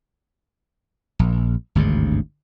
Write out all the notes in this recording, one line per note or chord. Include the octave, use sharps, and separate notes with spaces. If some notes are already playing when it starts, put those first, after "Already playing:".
A#1
G#1 D2 G2 C#3